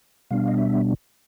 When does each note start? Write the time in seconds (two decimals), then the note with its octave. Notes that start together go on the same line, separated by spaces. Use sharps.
0.30 B2 G3 B3 D4 F5
0.48 D#5
0.58 E5